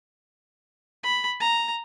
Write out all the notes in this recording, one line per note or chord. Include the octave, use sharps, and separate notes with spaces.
B5
A#5